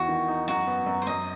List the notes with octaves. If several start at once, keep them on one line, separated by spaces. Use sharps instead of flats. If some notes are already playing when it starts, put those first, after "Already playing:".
Already playing: E2 E4 F#4
D#3
D#4
F#2 F#4
B3
F#2
C5
F#2 D#5